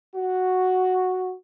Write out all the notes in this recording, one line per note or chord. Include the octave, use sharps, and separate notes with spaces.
F#4